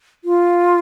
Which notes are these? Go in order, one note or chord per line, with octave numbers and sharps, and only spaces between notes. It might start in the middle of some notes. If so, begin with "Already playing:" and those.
F4